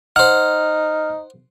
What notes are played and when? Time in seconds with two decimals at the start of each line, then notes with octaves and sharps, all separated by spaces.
0.16 D#4 C5 F#5 F6